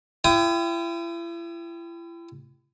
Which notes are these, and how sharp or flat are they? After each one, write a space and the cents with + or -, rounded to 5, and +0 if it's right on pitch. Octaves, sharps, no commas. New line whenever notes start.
E4 +40 G5 +0 D#6 +0